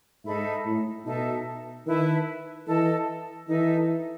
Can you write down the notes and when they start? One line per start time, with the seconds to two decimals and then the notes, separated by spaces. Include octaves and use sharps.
0.25 G#2 D#4 A4 E5 B5
0.66 A2
1.05 B2 D#4 A4 E5 A5
1.86 D#3 E4 B4 E5 A5
2.67 E3 A4 D#5 A5
3.47 E3 D#4 A4 E5